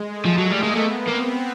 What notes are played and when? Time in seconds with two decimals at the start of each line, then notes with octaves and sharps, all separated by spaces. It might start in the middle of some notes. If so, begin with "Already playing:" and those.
Already playing: G#3
0.11 A3
0.26 F3
0.38 F#3
0.44 A#3
0.51 G3
0.63 G#3
0.76 A3 B3
1.08 A#3 C4